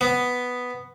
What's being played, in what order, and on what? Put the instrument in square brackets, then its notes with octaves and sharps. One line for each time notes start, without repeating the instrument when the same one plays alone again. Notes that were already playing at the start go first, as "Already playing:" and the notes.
[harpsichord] B3